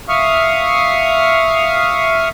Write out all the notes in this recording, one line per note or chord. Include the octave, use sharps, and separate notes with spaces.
E5 F5 C#6 D#6 F6